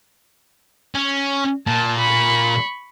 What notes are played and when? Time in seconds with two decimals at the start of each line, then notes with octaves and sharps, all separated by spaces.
0.95 C#4
1.67 A#2 A5
1.98 B5 C#6